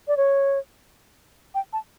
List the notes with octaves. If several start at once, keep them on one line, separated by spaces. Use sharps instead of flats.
D5
C#5
G5
A5